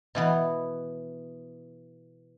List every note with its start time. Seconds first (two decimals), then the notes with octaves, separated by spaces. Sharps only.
0.15 B2 E3 B3